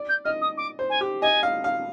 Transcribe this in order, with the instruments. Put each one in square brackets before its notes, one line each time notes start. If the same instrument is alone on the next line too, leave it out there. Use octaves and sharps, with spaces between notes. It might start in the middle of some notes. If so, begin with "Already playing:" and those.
Already playing: [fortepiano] D5
[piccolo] G6
[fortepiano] D#5 [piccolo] F6
[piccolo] D#6
D6
[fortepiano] C5
[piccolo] G#5
[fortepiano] G4
[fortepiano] D#5 [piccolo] G#5
[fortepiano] F5
F5